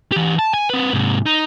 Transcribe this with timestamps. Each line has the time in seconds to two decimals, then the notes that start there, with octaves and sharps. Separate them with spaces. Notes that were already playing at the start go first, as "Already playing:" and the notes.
0.12 E3 G4
0.39 A5
0.54 G#5
0.70 C4 B4
0.93 G#2 C3
1.26 D#4